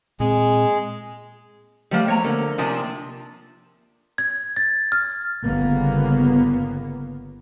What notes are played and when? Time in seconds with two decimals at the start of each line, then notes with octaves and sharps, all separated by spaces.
0.20 A#2 G#3 C4
1.91 F3 G3 A3 A#3
2.08 A#3 B3 C#5 A#5
2.24 D3 A#4
2.58 C3 F3 D4 D#4 G#5
4.18 G#6
4.57 A6
4.92 F6
5.43 G1 C#3 A#3 B3